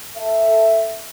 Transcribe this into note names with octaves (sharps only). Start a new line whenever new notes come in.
A4 E5